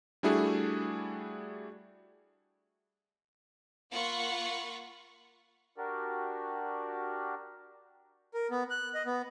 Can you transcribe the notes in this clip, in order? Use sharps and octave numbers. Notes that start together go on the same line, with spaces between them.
G3 A3 D4 E4 F#4 G#4
A#3 F4 F#5 B5 C#6
D4 F#4 G4 A#4 D5
A#4
B3
F#6
D#5
B3